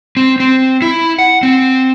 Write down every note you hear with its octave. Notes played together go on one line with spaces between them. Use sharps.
C4
C4
E4
F#5
C4